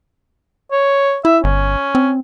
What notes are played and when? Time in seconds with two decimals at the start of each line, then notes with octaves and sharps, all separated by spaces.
0.72 C#5
1.25 E4 E5
1.44 G1 C#4
1.95 C4